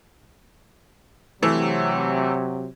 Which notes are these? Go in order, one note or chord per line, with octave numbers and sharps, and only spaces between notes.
C3 E3 F#3 A3